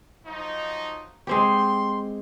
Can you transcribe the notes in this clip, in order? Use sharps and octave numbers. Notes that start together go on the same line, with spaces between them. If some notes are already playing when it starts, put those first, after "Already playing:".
F3 F#3 D#4
G#3 C4 G4 C6